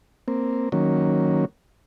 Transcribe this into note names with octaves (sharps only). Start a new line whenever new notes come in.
A#3 C4
D#3 F#3 A#3 C#4